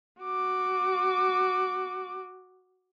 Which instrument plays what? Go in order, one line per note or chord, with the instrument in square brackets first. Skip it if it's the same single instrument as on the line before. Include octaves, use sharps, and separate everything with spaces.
[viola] F#4 D6